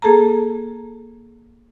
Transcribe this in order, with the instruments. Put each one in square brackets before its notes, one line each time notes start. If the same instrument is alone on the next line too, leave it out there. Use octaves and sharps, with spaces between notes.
[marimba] A#3 G#4 A4 A5 A#5